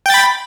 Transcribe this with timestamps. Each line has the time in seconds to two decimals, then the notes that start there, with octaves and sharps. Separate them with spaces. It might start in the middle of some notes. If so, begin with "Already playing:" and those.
0.06 G5
0.10 A6
0.14 B5